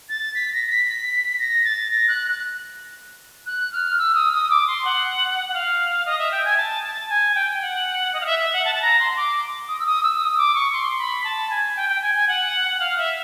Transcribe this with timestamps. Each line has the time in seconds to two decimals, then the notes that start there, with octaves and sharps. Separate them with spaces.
0.09 A6
0.35 B6
0.53 A#6
0.70 B6
1.39 A#6
1.65 A6
1.91 A#6
2.08 F#6
3.46 F#6
3.72 F6
3.98 E6
4.15 D#6
4.33 D#6
4.50 D6
4.67 C6
4.85 F#5
5.49 F#5
5.54 F5
6.06 D#5
6.19 E5
6.32 G5
6.45 G#5
6.57 A5
6.84 A5
7.09 G#5
7.35 G5
7.62 F#5
8.13 D#5
8.21 F5
8.26 E5
8.39 E5
8.53 F#5
8.65 A5
8.75 A5
8.82 A#5
9.00 C6
9.16 D6
9.68 D#6
9.79 E6
9.86 D#6
10.03 E6
10.20 D#6
10.38 D6
10.55 C#6
10.73 C6
10.98 B5
11.24 A5
11.50 G#5
11.76 G5
11.89 G5
12.02 G#5
12.15 G#5
12.28 F#5
12.80 F5
12.98 E5